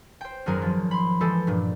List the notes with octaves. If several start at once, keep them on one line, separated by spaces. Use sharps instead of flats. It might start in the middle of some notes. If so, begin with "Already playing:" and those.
C5 G5
G#1 F#2 F#3 G#4 A#4
F3
B5 C6
E3 G#3 G4 A4
G2 A#2